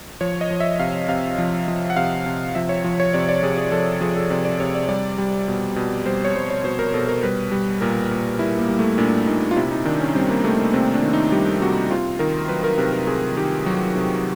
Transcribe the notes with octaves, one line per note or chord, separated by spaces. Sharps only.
F3 C#5
D#5
F3
E5
C3 F5
C3 F5
F3
F3
F#5
C3 F5
C3
F3 E5
C#5
F3
C#5
C3 D5
D5
C3 G#4
G#4
F3 A4
F3 G#4
A4
C3 D5
D5
C3 C#5
D5
G3 D5
G3
B2
B2
G3 C5
C#5
G3 C5
C#5
B2 C5
A#4
B2 A4
A#4
G3 B4
G3
A#2 A#4
A#2
G3 E4
A#3
G3
A3
A#2 D4
A#2 D#4
F4
C3 E4
D#4
D#3 D4
C#4
G3 C4
A#3
C3 A3
A#3
C3 C4
D4
D#3
D#4
G3 G4
C3 F#4
C3 F4
D#3 A#4
F#3 B4
A#4
C3 B4
A#4
C3 G#4
D#3 G4
F#3 F#4
C3